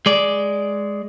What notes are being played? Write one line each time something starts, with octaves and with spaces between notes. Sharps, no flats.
G#3 D5